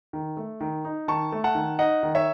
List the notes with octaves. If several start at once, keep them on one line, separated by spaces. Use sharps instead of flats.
D#3
A3
D#3
D#4
D#3 A5 C#6
A3
F#5 A5
D#3
D#4 D#5 F#5
D#3
C#5 E5